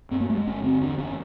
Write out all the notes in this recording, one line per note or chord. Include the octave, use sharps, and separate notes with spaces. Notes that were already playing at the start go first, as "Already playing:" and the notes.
G2 C4
A#3
G2 A3
G#3
G1 C#4
D3 C4
E2 D4
F#1 C#4